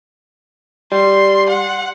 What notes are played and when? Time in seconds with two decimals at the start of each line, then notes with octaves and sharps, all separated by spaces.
0.92 G3 C6
1.49 F#5